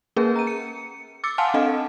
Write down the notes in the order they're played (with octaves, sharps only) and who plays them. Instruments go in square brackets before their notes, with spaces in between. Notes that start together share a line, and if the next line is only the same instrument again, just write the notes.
[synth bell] A#3 C#4 G#4 A#4 B4
A#5 D#7
C#7
D6 E6 A6 C#7
F5 F#5 G#5 A5 C6 F6
C4 D4 A4 D#5 F5